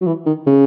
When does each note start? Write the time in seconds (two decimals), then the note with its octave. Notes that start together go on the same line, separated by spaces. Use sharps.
0.01 F#3
0.06 E3
0.26 D#3
0.46 C#3